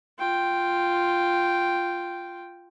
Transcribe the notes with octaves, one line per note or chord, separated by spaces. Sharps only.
F4 G5